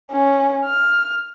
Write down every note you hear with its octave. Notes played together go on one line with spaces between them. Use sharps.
C#4
F6